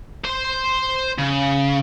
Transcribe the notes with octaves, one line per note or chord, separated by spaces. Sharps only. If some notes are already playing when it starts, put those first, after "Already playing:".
C5 C6
C#3